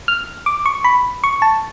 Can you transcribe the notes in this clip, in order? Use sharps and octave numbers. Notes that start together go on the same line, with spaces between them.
F6
D6
C#6
B5
C#6
A5